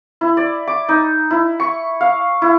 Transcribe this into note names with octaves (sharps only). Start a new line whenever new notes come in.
E4
D5
D6
D#4
E4
C#6
F5
E4